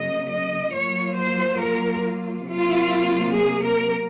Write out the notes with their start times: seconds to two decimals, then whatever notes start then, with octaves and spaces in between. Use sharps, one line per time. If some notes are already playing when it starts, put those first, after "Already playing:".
Already playing: C#3 F#3 A#3 D#5
0.30 D#5
0.73 F#3 A#3 F4 C#5
1.16 C5
1.60 A#4
2.47 C3 F#3 A#3 F4
3.35 G#4
3.64 A#4